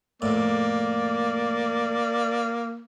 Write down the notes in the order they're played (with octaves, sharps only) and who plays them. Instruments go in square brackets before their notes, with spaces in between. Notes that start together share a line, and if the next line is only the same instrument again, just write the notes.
[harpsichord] F2 A2 [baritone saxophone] A#3 [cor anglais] D5